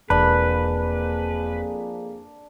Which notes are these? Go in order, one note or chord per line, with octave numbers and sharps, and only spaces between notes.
E1 F2 A#3 D4 G#4 B4 B5